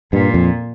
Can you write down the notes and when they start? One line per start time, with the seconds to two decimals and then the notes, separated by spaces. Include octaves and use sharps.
0.12 G2 A#2
0.34 F2